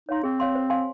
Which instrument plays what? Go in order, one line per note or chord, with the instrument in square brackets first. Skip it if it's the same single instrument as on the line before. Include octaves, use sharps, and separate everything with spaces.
[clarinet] D#4 [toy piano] C#5 F5 C6
[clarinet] C4 [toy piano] G#4
[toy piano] C#5 F5 C6
C5
F5 G#5 C6